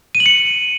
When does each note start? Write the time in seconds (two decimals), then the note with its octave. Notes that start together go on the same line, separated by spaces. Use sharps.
0.15 D#7
0.20 F#7
0.26 C#7